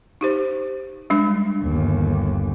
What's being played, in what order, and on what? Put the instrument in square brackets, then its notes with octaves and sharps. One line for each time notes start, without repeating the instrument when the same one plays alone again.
[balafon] D#4 G4 C5
G3 G#3 D4
[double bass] G1 D#2